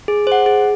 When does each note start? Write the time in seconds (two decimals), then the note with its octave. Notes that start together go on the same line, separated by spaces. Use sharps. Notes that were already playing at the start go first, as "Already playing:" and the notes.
0.08 G#4
0.27 C5 F#5
0.46 G#4